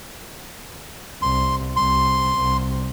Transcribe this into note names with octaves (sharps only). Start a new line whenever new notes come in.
C2 C6
C2 C6
C2